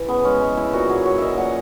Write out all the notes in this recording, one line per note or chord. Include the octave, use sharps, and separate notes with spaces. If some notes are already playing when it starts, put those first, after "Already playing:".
Already playing: E3
C#3 B3
G#3 C#4
G#3
C#3 E4
A#2 F#4
F#3 G#4
F#3 C#5
A#2 D#5 E5
A#2 F#5